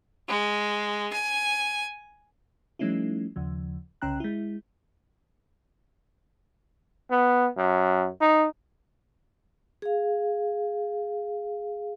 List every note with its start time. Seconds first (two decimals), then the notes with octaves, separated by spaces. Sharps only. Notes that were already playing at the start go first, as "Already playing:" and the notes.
0.29 G#3
1.13 G#5
2.79 F3 G3 A3 C#4 D#4 E4
3.36 D#2 C#3 F3
4.02 C2 C#3 C#4 G5 A#5 F#6
4.20 G#3 E4
7.11 B3
7.57 F#2
8.21 D#4
9.82 G#4 F5